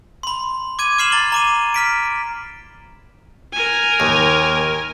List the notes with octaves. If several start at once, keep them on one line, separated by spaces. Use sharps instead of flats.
B5 C6
D6 G#6 D#7
D6 F6 C7 E7 F#7
A#5 A6 G7
A#5 D6 D#7
F6 B6 D7
A#4 G#5
D#2